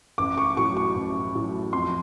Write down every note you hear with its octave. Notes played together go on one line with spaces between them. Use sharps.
A1 D6
C#6
A2 F#3 C#6
C#6
A1
A2 F#3
F2 C6